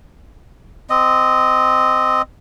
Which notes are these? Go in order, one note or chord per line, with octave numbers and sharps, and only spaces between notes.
C4 D#5